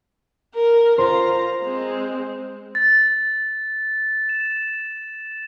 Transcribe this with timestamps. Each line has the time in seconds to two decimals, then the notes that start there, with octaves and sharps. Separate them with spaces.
0.54 A#4
0.98 F4 C5 A#5
1.64 G#3 C4
2.75 A6
4.29 E7